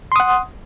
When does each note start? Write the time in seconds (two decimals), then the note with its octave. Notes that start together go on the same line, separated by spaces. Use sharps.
0.12 C6
0.16 D#6
0.20 F#5